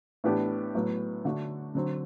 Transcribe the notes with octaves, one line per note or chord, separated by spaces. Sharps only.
A2 E3 B3 D4 G4
A2 F#3 B3
D3 A3 D4 F#4
D3 F#3 C4